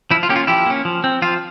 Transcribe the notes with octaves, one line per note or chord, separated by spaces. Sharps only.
F3 E4
F4
A#3 C#4 G4
F4
F3 E4 G4
A#3 C#4
F3
C4
F3 F4